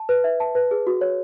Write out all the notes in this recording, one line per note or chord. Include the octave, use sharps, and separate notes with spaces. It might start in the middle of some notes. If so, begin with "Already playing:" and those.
Already playing: A5
B4
E5
A5
B4
G#4
F#4
C#5